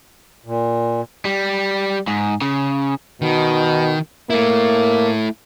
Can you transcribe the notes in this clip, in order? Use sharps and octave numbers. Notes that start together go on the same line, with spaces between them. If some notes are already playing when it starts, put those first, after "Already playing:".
A#2
G3
G#2
C#3
B2 D#3
A3 A#3 E4